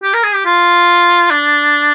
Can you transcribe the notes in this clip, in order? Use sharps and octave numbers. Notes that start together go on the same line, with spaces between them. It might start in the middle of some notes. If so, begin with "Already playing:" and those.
G4
A#4
G#4
G4
F4
D4